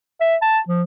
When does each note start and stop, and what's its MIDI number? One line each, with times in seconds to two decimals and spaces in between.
0.21 0.36 76
0.42 0.59 81
0.68 0.83 53